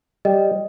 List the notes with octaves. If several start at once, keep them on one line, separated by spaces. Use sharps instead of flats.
G3 D#5